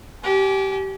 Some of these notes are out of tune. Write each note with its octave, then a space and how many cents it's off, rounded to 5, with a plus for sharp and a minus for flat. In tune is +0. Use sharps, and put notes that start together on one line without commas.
G4 -20 G#5 +25